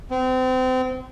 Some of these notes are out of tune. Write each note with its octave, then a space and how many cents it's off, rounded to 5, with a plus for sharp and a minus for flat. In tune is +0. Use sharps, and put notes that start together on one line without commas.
C4 -30